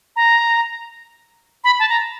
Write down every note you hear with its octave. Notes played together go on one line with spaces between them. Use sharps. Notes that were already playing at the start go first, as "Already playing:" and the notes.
A#5
B5
A5
A#5